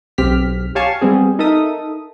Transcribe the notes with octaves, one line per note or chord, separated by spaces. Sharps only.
B1 C4 G4 F6 B6
G4 C#5 F5 G#5 A5 C#6
G3 B3 C4 G#4
D#4 A4 A#4 E5 D#6